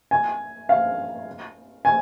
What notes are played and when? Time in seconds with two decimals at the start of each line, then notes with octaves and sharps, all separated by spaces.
0.11 G#5
0.69 F5
1.85 G#5